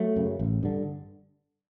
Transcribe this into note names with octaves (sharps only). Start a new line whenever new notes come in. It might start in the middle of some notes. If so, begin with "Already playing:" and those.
Already playing: F#3 A3
F#2 C#3
A1
G2 D3